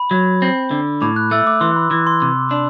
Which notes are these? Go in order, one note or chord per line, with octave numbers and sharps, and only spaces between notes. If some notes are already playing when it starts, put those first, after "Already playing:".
Already playing: B5
F#3
C4
D3
A2 D6
F#6
A3 E6
D6
E3 C6
B5
E3 D6
C6
C3
D4